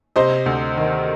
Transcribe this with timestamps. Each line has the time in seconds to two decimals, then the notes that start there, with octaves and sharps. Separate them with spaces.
0.16 C3 C5 D#5
0.46 D2
0.77 D#3